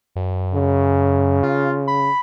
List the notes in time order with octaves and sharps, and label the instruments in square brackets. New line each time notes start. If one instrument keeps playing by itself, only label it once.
[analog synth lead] F#2
[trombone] C#3
[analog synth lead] F4
B5